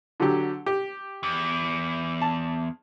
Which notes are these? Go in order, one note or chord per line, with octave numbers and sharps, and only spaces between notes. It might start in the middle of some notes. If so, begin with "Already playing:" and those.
D3 F#3 G4
G4
E2
A5